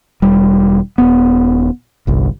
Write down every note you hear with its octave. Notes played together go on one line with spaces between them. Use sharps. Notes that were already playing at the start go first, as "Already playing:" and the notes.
E1 G3
D#1 B3
G1 C2